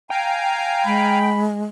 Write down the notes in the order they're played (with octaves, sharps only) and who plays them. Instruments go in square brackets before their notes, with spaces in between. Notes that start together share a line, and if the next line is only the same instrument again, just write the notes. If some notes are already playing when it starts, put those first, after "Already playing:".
[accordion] F5 G#5 A#5 [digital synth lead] G5
[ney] G#3 [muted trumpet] B5